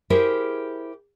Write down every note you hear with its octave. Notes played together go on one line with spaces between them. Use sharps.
E4 G4 G#4 A#4 C5